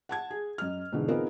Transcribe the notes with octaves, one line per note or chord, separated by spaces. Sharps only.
F#5 A5 G#6
G#4
F#2 D#5 F6
G#2 B2 D3 E3
B3 C4 D#4 F4 G#4 A#4